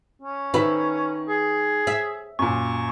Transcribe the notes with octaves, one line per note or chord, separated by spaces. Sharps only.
C#4
D#3 B4 E5
G#4
E5
F#2 A#2 C#6